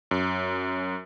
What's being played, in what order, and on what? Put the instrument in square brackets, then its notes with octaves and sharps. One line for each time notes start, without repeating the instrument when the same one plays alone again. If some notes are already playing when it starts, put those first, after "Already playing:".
[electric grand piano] F#2